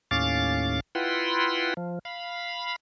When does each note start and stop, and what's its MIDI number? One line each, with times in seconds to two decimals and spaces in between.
0.11 0.80 39
0.11 0.80 45
0.11 0.80 61
0.11 0.80 77
0.11 0.80 86
0.11 0.80 93
0.95 1.74 64
0.95 1.74 65
0.95 1.74 71
0.95 1.74 78
0.95 1.74 79
0.95 1.74 84
1.77 1.99 53
2.05 2.76 77
2.05 2.76 83